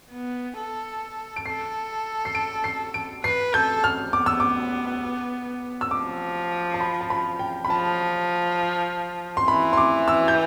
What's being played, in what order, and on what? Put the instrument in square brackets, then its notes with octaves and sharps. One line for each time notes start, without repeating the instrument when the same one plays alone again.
[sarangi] B3
A4
[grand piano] D7
[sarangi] A4 [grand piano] C7
[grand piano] C7
D7
C7
D7
[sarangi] B4 [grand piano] C7
[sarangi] A4 [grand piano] G6
[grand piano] F6
[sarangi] B3 [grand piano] D6
[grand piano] E6
D6
E6
[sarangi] F3 [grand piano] D6
[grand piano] A5
B5
A5
B5
G5
B5
[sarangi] F3 [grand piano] A5
[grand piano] C6
[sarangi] E3 [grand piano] B5
[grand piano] C6
D6
E6
G6